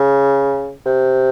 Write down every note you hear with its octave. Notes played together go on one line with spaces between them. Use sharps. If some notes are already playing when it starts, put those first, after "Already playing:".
Already playing: C#3
C3